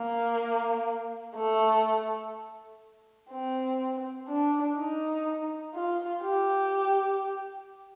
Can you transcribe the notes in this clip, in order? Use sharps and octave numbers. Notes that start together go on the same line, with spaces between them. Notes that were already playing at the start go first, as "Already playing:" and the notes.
Already playing: A#3
A3
C4
D4
D#4
F4
G4